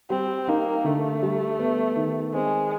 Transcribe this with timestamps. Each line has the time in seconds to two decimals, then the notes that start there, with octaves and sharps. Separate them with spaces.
0.10 G3 C4
0.48 A#3 D#4
0.84 D3 A3
1.22 G3
1.59 B3
1.96 D#3
2.33 G#3 C4